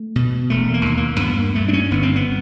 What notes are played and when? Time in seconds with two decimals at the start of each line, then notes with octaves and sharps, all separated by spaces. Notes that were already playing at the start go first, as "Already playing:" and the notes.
Already playing: A3
0.16 B2
0.50 E1 A3
0.74 A#3
0.85 D#2
0.97 A#3
1.20 G2 B3
1.38 A#3
1.55 G2 A3
1.68 D4
1.73 C#4
1.91 G1 B3
2.03 C4
2.16 B3